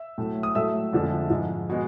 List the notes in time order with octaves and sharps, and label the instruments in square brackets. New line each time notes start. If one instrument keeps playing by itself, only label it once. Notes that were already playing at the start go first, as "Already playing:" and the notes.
Already playing: [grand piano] E5 E6
A2 F#3 A3
D#6
A2 F#3 A3 E5 E6
F2 D3 F3 G#3
G#2 F3 G#3
B2 G#3